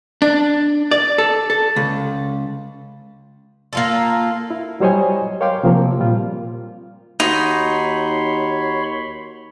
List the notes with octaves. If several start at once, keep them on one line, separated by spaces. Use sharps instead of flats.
D4
D5
A4
A4
C#2
A#3 F4 A4
E4
F#3 G3 C5 C#5 D#5 G#5
A#4 C#5 F5 G5 C6 D6
C3 F3 A#3 C4
A#2 G3 F4
D#2 D#4 F#4 C#5 F#5 B5 C6